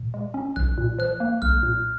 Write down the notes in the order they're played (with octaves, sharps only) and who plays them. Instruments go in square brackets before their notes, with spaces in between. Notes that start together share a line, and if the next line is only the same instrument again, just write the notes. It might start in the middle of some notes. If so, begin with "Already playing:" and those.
Already playing: [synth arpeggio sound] A#2
G#3
C#4
[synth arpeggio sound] B1 [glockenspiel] F#6
[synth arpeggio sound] A#2
[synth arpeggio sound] F3 [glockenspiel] F#6
[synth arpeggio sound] A#3
[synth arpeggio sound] B1 [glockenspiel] F6
[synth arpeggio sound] A#2